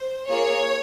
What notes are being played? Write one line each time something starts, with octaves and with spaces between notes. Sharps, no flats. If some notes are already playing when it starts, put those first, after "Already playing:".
Already playing: C5
A#3 F4 G#4 C#5